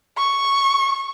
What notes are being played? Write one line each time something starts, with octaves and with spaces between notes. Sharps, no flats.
C#6